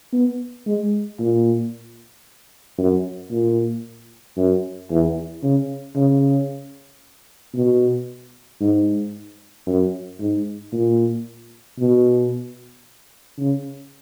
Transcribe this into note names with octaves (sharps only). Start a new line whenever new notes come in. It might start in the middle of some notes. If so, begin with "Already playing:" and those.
B3
G#3
A#2
F#2
A#2
F#2
E2
C#3
C#3
B2
G#2
F#2
G#2
A#2
B2
C#3